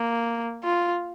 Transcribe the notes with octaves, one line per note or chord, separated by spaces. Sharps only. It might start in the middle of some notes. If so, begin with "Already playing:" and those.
Already playing: A#3
F4